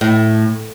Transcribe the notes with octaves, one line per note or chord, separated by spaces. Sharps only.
A2